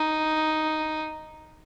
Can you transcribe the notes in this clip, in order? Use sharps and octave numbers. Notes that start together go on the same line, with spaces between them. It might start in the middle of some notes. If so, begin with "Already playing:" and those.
Already playing: D#4